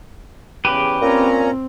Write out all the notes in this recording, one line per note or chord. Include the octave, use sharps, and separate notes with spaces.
E2 C#3 G4 B4
A#2 C4 C#4 A#5